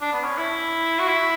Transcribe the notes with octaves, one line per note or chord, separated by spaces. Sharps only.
D4
B3
C#4
E4
F#4
E4